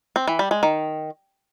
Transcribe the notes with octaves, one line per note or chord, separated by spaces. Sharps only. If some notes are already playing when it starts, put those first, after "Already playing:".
C4
E3
G3
G#3
D#3